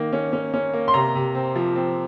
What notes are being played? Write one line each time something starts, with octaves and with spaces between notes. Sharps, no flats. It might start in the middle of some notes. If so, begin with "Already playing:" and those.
Already playing: D#3 A#3
C#4
C#4
C#4
A#3
C6
C3 A#5
C3
C4
F3
C4